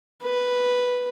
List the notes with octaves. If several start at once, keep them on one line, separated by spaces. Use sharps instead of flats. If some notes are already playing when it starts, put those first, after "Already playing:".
B4